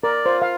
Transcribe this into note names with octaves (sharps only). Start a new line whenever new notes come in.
A#4 D5
F4 C5
F5